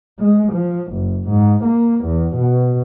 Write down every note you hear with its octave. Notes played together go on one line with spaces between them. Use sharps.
G#3
F3
F#1
G#2
A#3
E2
B2